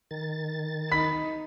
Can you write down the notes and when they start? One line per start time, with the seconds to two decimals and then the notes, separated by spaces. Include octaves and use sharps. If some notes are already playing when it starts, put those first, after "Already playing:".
0.11 D#3 A6
0.91 D#4 B5 B6